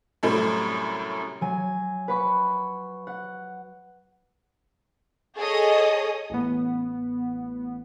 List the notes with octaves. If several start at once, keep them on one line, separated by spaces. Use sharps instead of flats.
F#2 A2 C3 G3 A3
F#3 G#5
B4 F#5 B5 C#6
F#5
G#4 A4 C#5 D#5 D#6
A1 B3